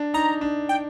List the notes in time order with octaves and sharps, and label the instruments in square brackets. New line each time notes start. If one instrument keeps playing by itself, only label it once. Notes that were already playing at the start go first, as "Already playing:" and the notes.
Already playing: [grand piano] D4
[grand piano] D#4 [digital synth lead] A#5
[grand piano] D4
[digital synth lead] G5